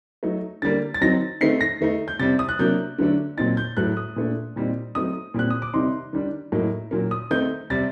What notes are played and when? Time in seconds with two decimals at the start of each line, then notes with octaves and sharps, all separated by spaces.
0.23 F#3 A3 D#4
0.62 D3 G3 A#3 A6
0.94 A6
1.01 D#3 F#3 C4 D#4 A#6
1.41 D#3 A3 C4 D#4 C7
1.61 A#6
1.81 D#3 A3 D#4
2.08 G6
2.19 C3 G3 C4 A6
2.39 D#6
2.49 F#6
2.59 C3 F#3 A#3 D4 G6
2.98 D3 F#3 A3 D4
3.37 A#2 F#3 C4 D#4 A6
3.57 G6
3.77 A2 F#3 A3 F#6
3.97 D#6
4.16 A#2 A3 D4
4.56 A#2 G3 C4 D#4
4.95 F#3 A3 C4 D#4 D#6
5.34 A#2 G3 C4 F#6
5.50 D#6
5.62 D6
5.74 C3 D#3 G3 C4 D#4 C6
6.13 D#3 G3 D4
6.52 A2 F#3 A#3 D#4
6.91 A#2 F#3 A#3
7.11 D#6
7.31 D#3 A3 C4 D#4 G6
7.70 C3 G3 C4 A6